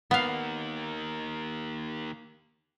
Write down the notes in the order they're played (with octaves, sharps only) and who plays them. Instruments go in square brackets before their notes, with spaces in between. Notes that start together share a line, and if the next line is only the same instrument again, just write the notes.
[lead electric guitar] D#3 A#3 [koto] B3 F5